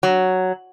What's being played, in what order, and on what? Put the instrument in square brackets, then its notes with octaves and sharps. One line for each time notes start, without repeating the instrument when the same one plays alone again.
[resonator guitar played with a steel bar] F#3